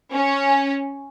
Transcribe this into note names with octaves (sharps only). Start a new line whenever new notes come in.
C#4